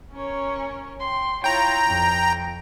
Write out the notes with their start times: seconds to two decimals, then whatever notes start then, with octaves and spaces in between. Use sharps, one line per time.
0.12 C#4 A#4 C#5
1.00 G5 C6
1.44 E4 F4 C#5 G5 A#5
1.87 F2